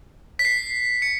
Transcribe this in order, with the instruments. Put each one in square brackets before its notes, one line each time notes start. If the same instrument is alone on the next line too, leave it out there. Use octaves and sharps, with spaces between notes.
[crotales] B6
C7
C#7